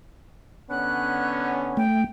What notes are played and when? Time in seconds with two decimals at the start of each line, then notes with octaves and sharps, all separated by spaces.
0.71 D3 B3 C#4 F#6
1.77 A3 G5